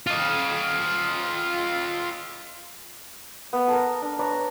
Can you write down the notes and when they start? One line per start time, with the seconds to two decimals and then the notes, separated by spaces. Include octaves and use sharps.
0.07 F4 D#5
3.53 B3
3.68 A4 A#4
4.02 D4
4.19 B4 C#5 D5 A#5